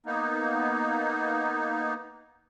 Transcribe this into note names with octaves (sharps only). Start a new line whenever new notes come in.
A#3 B3 D#4